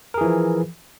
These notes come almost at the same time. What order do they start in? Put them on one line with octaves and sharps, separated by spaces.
A#4 G#4 E3 F3